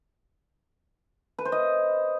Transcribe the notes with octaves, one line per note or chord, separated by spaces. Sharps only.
B4
C5
D#5